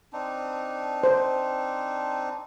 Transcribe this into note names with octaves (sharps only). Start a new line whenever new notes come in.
C4 D4 D#4
C5